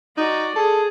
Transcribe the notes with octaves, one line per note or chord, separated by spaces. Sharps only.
D#4 F#4 D5
G#4 A4